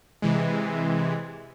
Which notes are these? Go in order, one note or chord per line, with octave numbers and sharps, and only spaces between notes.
C3 E3 G#3